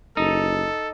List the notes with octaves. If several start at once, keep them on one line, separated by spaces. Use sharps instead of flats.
F#1 D#4 A4